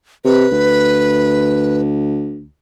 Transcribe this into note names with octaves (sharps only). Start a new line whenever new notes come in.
C3 B4
D2